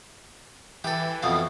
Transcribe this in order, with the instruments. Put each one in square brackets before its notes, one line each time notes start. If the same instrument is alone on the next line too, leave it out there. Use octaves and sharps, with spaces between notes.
[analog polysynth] E3 [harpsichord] G4 A4
[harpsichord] F2 B2 F5